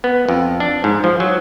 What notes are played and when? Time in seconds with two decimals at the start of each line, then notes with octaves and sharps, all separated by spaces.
0.04 B3
0.29 F2
0.60 D4
0.84 G#2
1.04 F3
1.20 F#3